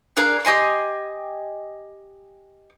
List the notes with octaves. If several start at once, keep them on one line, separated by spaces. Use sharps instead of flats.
D4 G#4 A#4 F5
G4 D#5 G#5 C6